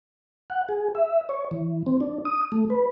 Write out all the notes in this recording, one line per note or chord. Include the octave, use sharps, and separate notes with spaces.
F#5
G#4
E5
C#5
E3
C4
D4
D#6
A3
B4